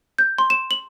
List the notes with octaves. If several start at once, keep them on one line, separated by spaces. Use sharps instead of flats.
G6
C6
E7
F#7